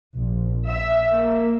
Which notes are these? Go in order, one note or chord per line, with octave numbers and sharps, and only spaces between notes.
A#1
E5
A#3